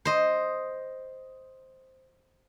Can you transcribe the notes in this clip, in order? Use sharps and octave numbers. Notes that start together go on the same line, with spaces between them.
C5 D#5